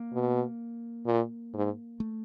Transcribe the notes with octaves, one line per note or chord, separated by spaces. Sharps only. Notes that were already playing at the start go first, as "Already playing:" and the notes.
Already playing: A#3
B2
A#2
G#2
A3